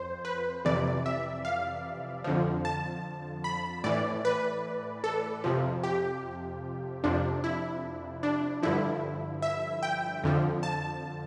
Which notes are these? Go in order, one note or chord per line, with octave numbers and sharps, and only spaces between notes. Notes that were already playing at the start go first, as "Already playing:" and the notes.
Already playing: F2 C5
B4
F2 C3 E3 D5
E5
F5
F2 D3 F3
A5
B5
A2 E3 D5
B4
A4
F2 C3 F3
G4
F2 C3 F3 D4
E4
D4
G2 D3 F3 E4
E5
G5
F2 D3 F3
A5